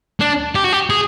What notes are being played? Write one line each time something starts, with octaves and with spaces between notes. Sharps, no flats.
D4
G4
F#4
G4
G#4